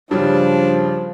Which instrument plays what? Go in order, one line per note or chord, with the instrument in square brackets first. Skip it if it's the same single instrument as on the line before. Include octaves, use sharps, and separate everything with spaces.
[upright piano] G2 C#3 G3 [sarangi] F3 [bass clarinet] D4